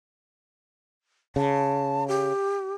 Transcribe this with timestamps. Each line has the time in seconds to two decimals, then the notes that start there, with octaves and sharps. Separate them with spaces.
1.36 C#3 A5
2.08 G4